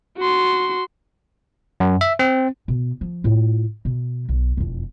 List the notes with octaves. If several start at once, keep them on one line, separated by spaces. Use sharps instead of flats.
F#4 C6
F#2
E5
C4
B2
F3
A2 F4
B2
B1
E1 F2